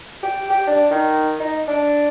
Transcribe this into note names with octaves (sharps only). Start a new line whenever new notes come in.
G4
G4
D4
D#3
D#4
D4